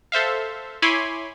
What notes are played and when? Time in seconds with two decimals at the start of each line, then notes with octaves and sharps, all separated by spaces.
0.12 A4 C5 E5 F5
0.82 E4 C#5 G#5 B5 C6 D6